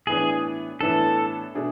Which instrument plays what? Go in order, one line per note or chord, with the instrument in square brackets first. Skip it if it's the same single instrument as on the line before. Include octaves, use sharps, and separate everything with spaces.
[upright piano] A2 E3 B3 D4 [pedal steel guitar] G#4
[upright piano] A2 E3 B3 D4 [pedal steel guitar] A4
[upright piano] B2 A3 D4 G#4